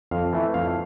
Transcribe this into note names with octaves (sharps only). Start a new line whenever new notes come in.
F2 F5
E3 A3 E4
F2 F5